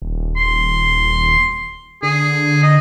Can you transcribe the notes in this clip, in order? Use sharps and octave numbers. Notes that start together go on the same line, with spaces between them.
D#1
C6
D3 G#4
D#5